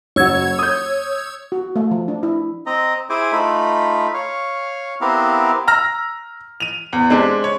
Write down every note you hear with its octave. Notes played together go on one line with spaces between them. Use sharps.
F#1 F#4 C#5 E6 G#6
D#6 G6
F#4
A3
F3
D4
E4
C4 D#5 A#5
E4 G#4 C5 G#5 D6
A3 D#4 F4 B5
C#5 F5
B3 C4 E4 G4 A#4 F5
A#5 E6 F6 A#6
D#7 F7
E2
G#3 C4 D4 G4
C#5